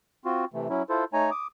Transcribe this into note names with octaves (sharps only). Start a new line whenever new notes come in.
C4 F4 F#4
C3 E3 A3
F#3 C#4 E4
E4 F4 A4 C5
A3 D#4 C#5 G#5 A#5
D6 D#6